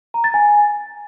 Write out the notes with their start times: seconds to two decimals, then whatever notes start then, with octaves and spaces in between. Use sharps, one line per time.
0.14 A#5
0.24 A6
0.34 G#5